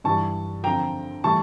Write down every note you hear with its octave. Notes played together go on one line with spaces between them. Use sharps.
G2 E3 G3 A5 C#6
F2 D3 F3 G5 A#5
A2 E3 G3 A5 C#6